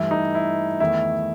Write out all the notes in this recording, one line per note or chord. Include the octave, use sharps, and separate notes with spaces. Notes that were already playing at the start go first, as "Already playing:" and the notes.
Already playing: G2 E3 A3 E4
D#4
E4
E2 D#3 A3 E4